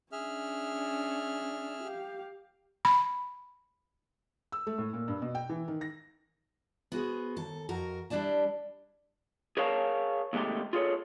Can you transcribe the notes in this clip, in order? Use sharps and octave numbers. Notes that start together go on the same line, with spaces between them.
C#4 D4 G#4 E5 F6
G4 F5
B5
E6
A3
A2
A#2
G2
B2
G5
E3
D#3
A#6
B3 F#4 G#4 C5
D#2 A4
F2 F#4 A#4
G3 D4 E4 D5 A5
G#4 A#4 C#5 F5 F#5 A5
D#2 C3 G#3 A3 G4
F4 G#4 A4 C#5